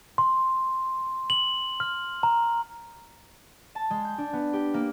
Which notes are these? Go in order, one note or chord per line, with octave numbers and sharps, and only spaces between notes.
C6
F#7
F6
A#5
A5
G#3
G6
D4
B3
G4
A#3